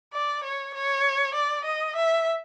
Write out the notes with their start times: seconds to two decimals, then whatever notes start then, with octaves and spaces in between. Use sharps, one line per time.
0.14 D5
0.44 C#5
0.75 C#5
1.35 D5
1.65 D#5
1.96 E5